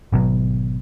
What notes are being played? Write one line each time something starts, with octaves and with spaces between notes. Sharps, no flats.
G#1 B2 F#3